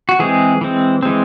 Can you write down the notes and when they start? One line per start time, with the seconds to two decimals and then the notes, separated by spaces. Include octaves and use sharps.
0.09 F#4
0.19 E3 G#3 C4 G#4
0.61 E3 G#3 C4
1.03 E3 G#3 C4